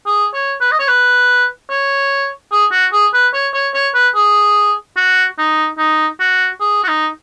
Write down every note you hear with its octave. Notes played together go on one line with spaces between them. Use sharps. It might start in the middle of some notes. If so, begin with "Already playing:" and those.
G#4
C#5
B4
D#5
C#5
B4
C#5
G#4
F#4
G#4
B4
C#5
C#5
C#5
B4
G#4
F#4
D#4
D#4
F#4
G#4
F#4
D#4